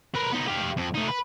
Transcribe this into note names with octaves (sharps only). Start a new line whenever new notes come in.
A#4 B4
B3 D#4
G4 F5
F2
A3 D#4
B4